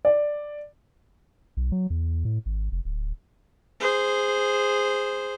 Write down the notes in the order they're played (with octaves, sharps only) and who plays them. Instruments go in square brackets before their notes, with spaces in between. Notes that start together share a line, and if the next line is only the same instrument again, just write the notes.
[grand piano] D5
[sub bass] B1
F#3
E2
A2
G#1
F1
D1
[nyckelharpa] G#4 C5